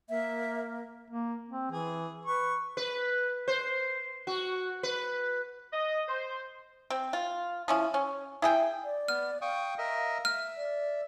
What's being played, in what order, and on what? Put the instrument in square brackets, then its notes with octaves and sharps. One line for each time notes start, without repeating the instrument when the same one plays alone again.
[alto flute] A#3 [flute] E5
[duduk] A#3
C4
[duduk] E3 [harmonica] G#4
[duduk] B4 [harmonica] C#6
[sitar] B4
C5
F#4
B4
[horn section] D#5
C5
[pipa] C4
F4
F3 C#4 E4
C#4
E4 G#4 G5
[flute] D5
[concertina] B3 [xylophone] F6
[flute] F5 [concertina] G5 C#6 D#6
[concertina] A#4 D#5 E5
[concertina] E5 [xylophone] F6
[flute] D5